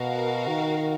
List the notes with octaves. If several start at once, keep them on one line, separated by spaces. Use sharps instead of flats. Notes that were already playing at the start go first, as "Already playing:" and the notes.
Already playing: B2 F#4 A#4 F5
D#3